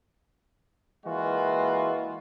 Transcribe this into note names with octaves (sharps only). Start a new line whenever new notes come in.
E3 G#3 A#3 F4 F#4